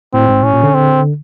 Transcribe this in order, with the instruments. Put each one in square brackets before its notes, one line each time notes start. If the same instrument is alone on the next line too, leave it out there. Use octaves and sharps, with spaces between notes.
[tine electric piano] A2 [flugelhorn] C4
[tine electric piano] G#2
[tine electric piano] A2 [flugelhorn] C#4
[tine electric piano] A#2
D3
[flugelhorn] C4